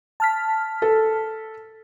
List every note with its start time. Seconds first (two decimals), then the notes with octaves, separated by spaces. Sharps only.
0.20 A5 F6 B6
0.82 A4